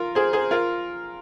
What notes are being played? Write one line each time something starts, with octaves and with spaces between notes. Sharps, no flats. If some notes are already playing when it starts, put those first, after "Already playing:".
Already playing: F4 A#4
G#4 C5
G#4 C5
F4 A#4